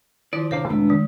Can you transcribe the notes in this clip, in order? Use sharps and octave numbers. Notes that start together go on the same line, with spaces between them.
D#3 F3 E4 D5
D#1 C3 D4 C5 C#5 F5 D6
F2 C3 G#3 A3 B3 D4 E6
D#3